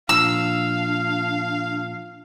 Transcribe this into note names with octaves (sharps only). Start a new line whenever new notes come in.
A#2 F3 D4 F5 E6